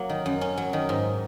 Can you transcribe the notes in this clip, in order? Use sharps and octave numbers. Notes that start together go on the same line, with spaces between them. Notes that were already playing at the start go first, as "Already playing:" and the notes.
Already playing: F#3 A#3
D#3
F#2
C#4
F#3
D#3
G#2